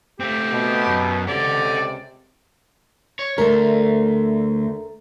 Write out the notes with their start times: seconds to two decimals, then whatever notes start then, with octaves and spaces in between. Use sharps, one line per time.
0.20 A3 C4 G4
0.52 B2
0.88 F#2
1.28 C#2 C3 A4 D5 F#5
3.19 C#5
3.38 D2 A3 A#4